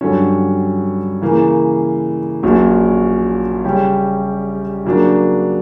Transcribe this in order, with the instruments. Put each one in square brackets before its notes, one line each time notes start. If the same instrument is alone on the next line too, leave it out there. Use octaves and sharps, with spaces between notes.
[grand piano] G2 D3 F#3 C#4
C#3 E3 A#3
A#1 A#2 F#3 C#4
C#3 G3 C#4 G4
C#3 F#3 A#3 D4